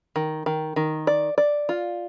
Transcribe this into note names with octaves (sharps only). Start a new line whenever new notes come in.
D#3
D#3
D#3
D5
D5
F4